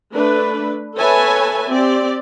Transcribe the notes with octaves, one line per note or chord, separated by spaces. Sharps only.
A3 D4 B4
A4 B4 C#5 E5 G#5 A5
C4 G4 D5